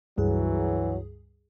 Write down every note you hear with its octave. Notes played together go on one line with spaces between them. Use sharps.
C#2 G2 E3 F#3 G#4